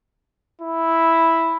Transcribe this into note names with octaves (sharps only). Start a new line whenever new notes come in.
E4